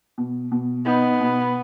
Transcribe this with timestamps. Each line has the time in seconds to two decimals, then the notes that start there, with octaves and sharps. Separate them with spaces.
0.18 B2
0.52 B2
0.86 B3 D#4
1.21 B2